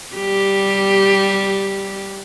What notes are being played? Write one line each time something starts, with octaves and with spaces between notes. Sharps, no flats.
G3 G4